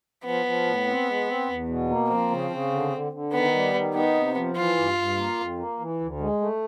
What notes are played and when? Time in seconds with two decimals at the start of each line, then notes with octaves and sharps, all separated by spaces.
0.25 F3 B3
0.46 F3
0.66 A2
0.87 C4
1.07 G#3
1.28 C4
1.48 E2
1.68 B2
1.90 A#3
2.09 F3 C4
2.30 C#3
2.51 C#3
2.72 D3
2.93 D3
3.12 D3
3.32 D#3 B3
3.53 G3
3.74 D#3
3.94 B3 D#4
4.15 C3
4.36 F3
4.57 E3 F4
4.77 G2
4.97 G2
5.17 A#3
5.38 F2
5.59 A#3
5.79 E3
6.00 D2
6.20 G#3
6.41 A3